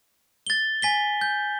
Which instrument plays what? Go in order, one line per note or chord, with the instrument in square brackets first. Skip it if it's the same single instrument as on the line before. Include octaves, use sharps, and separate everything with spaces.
[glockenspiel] A6 G7
G#5 B6 G7
G6